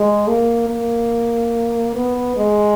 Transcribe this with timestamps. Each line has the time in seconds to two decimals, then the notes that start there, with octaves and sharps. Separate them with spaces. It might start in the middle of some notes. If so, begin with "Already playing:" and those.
Already playing: G#3
0.28 A#3
0.69 A#3
1.95 B3
2.37 G#3